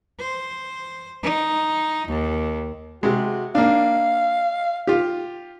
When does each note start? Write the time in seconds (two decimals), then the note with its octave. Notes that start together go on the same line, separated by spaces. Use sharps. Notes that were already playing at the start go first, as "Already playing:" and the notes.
0.19 C5
1.23 D#4
2.07 D#2
3.03 C3 G#3 F#4
3.55 A#3 D4 F5
4.87 F4 G4